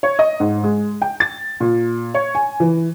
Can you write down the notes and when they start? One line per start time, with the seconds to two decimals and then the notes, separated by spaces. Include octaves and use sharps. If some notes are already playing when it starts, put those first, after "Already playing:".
0.03 C#5
0.19 D#5
0.40 G#2
0.63 G#3
1.02 G5
1.20 A6
1.60 A#2
2.14 C#5
2.35 G#5
2.60 E3